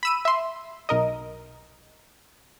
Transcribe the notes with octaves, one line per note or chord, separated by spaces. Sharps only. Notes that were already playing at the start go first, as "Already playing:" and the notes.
B5 E6 D#7
E5 C6
B1 A#4 D#5